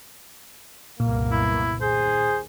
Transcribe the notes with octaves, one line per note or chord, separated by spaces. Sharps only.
F#1 C2 A#2 A#3 B3
E4
D#2 G#4 C5